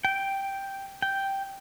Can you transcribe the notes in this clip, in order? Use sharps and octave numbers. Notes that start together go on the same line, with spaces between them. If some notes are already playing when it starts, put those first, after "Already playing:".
G5
G5